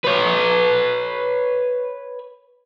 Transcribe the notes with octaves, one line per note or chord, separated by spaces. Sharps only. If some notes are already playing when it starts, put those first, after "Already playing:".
B4 C#5